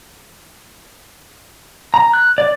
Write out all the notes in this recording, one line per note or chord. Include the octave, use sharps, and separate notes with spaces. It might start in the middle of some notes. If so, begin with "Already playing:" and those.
A#5
F#6
D5